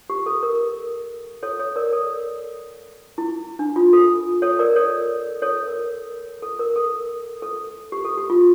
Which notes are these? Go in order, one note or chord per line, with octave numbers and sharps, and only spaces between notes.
G4
A4
A#4
A4 C#5
A4 C#5
A#4 D5
A4 C#5
E4
D4
F4
A4
A4 C#5
A#4 D5
A4 C#5
A4 C#5
A#4
A4
A#4
A4
A4
G4
A4
G4
F4